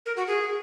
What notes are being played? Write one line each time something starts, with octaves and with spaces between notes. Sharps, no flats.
A#4
F#4
G#4